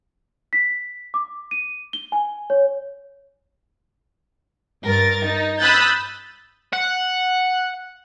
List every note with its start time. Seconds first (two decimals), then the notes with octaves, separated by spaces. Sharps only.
0.53 B6
1.14 D6
1.51 D#7
1.93 G7
2.12 G#5
2.50 C#5
4.84 G2 A#4 A6
5.27 D#4
5.60 B5 D#6 E6 F#6 G6 A6
6.73 F#5